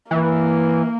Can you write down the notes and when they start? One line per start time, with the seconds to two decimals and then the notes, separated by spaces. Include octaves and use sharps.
0.11 E3 A#3